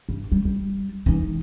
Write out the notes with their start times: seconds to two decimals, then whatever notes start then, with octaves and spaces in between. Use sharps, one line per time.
0.09 G2
0.32 G3
0.45 G3
1.06 E3 D#4